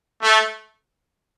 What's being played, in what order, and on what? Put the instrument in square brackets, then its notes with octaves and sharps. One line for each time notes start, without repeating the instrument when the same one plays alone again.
[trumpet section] A3